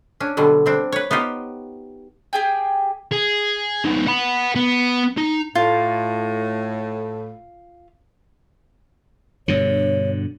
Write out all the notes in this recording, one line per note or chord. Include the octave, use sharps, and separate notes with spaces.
C#4 D4
B2 D3 F#3 G3
G3 C4 D4
B4 C#5
B3 D#4 F4 G4
G4 G#4 G5
G#4
C2 D#4
F#5 B5
B3
D#4
A2 F4
G2 B2 D3 C#5